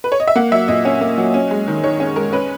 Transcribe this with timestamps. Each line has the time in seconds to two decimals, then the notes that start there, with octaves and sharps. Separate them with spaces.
0.04 B4
0.12 C#5
0.20 D#5
0.28 E5
0.36 A#3 F#5
0.52 F#3 E5
0.68 A#2 D#5
0.85 C#4
1.01 A#3
1.18 F#3
1.34 C#4
1.51 G#3
1.68 D#3
1.83 D#3 C#5
2.00 C#4
2.16 G#3 A#4
2.33 C#4 B4